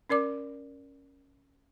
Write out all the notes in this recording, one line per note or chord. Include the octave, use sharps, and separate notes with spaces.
C#4 A#4 D5 D6